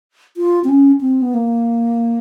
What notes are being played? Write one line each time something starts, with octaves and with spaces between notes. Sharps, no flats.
F4
C4
C#4
C4
B3
A#3